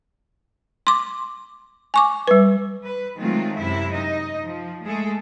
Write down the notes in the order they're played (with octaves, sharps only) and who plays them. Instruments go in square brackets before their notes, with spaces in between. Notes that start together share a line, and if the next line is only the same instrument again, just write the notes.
[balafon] C6 D6
G#5 C#6 D6
G3 B4
[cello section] B4
D#3 F#3 G#3 A3 C4 F4
F#2 C3 E4 E5
D#4 D#5
F3
G#3 A3 G#4 A4